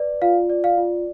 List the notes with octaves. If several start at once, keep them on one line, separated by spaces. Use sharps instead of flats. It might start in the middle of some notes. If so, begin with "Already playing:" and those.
Already playing: B4 D5
F4 F5
D5
F5
F4